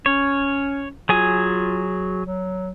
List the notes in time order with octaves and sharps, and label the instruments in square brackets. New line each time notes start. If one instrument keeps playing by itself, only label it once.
[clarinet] C#4 [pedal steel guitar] C#5
[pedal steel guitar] F#3 G#4 G#5 [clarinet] F4
[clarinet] F#3